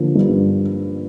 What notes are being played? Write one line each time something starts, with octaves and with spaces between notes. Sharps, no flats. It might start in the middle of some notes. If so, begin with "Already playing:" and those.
Already playing: D3 F3 A#3
G2